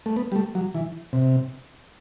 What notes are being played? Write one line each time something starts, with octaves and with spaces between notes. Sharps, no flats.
A3
B3
G3
A3
F#3
E3
C3